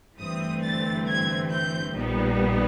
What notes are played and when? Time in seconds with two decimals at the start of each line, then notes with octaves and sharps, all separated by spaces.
0.19 G1 G2 E3 A3 C4 D#6
0.63 A6
1.07 G#6
1.50 G6
1.95 A#1 A#2 G3 B3 D#4